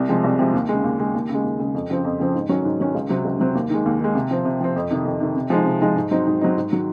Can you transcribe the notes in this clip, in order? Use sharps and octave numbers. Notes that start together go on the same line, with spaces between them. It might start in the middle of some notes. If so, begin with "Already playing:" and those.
Already playing: C2
C3 F3 G#3
C2
C3 F3 G#3
D#2
C#3 G#3
D#2
C#3 G#3
D#2
C#3
G#3
D#2
C#3 G#3
F2
C#3 F3 C4
F2
C#3 F3 C4
G#2
D#3 F#3 C#4
G#2
D#3 F#3 C#4
C#2
C3 F#3 C4
C#2
C3 F#3 C4
D#2
D#3 G#3
D#2
D#3 G#3
C3
F3 C4
C3
F3 C4
F2
C3 D#3
F2
C3 D#3
C3
F3 G#3 D#4
C3
F3 G#3 D#4
G#2
F#3 C4 D#4
G#2
F#3 C4 D#4
G#2
D#3 F#3